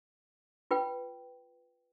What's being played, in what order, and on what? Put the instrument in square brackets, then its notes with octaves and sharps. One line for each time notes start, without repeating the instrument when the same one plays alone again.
[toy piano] F4 B4 G5